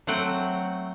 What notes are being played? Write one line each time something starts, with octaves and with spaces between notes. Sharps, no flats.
F#3 A3 C4 F#5 G5